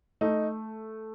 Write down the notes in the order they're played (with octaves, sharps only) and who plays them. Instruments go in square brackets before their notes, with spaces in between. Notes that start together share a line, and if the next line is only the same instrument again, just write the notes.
[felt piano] A3 [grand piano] D#4